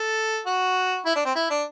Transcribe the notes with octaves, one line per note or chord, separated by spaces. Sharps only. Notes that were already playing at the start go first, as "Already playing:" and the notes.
Already playing: A4
F#4
E4
D4
C4
E4
D4